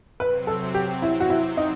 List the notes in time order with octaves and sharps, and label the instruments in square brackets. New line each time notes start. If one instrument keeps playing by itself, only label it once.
[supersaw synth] C3 F#3 C4 [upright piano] B4
[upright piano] A4
G4
E4
F#4
E4
D#4